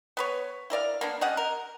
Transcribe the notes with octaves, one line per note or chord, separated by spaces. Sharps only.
B3 B4 C#5
E4 A#4 D5 F5
A#3 B3 D4
G3 C#4 D#5 F#5
A#4